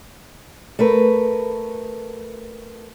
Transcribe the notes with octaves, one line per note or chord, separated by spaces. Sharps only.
A3 A#4 B4